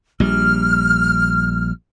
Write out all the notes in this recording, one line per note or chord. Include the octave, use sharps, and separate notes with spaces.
A#1 G3 F6